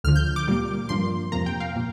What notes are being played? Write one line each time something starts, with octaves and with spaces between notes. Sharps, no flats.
D2 D3 F3 F6
G6
D6
A#2 G3 A#3
G2 F3 A#3 C6
F2 C3 F3 A#3 A#5
G5
F5
A#2 A#3